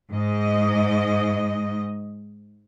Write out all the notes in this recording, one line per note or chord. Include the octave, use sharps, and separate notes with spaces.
G#2 D#5